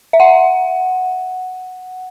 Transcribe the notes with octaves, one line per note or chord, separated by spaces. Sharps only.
E5
F#5